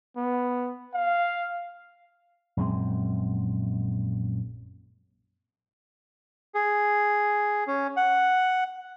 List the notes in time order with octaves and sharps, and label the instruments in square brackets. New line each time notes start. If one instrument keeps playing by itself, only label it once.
[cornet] B3
F5
[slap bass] A#1 F#2 G#3 C4
[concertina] G#4
C#4
F#5